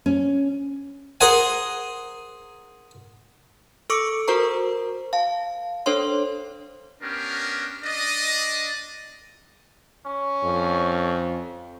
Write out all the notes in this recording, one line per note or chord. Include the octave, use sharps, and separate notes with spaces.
C#4
G#4 A#4 C5 F#5 G#5
A4 C#6 D6 E6 C#7 D7
F#4 A#4 C5 A#5 C#6
F5 A5
D4 A4 C5 C#5 C6
B3 C#4 D4 G4 A#4
D4 D5 D#5
C#4
F2